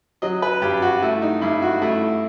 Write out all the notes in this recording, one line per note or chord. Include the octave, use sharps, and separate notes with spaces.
F#3 D#5
B4
G2 G4
F#4
A3 E4
D#4
G2 E4
F#4
A3 E4